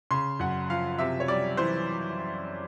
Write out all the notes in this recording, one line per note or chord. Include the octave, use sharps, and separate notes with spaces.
C#3 C6
F#2 F#5
F3 F5
C3 E5
C#5
G3 D5
E3 C5